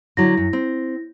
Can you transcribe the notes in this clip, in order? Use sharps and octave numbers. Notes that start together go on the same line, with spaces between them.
D3 F#3 E4 A#6
F#2
C4